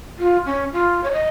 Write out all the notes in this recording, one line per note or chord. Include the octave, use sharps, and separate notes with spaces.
F4
C#4
F4
C#5
D#5